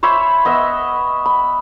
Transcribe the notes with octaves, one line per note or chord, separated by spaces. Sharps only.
C5 C#5 E5 B5
B3 D#5 E5 E6
B5